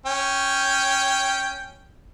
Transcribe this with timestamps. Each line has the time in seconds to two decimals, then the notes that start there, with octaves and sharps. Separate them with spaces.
0.06 C#4 G5